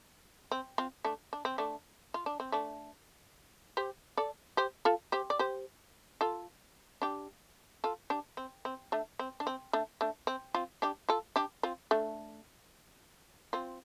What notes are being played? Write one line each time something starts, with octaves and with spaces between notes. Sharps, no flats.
C4
C4 F4
A3 D4
D4
C4
A3 D4
F4
D4
C4
A3 D4
G4 C5
A4 D5
G4 C5
F4 A4
G4 C5
D5
G4 C5
F4 A4
D4 G4
F4 A4
D4 G4
C4
C4
A3 D4
C4
D4
C4
A3 D4
A3 D4
C4
C4 F4
D4 G4
F4 A4
D4 G4
C4 F4
A3 D4
C4 F4